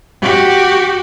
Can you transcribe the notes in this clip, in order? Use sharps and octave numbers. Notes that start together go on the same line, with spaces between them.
F#4 G4